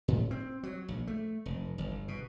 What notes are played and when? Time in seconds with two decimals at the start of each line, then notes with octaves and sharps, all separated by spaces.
0.08 A2
0.31 C4
0.63 F#3
0.88 A#1
1.07 A3
1.46 F1
1.78 G1
2.08 B2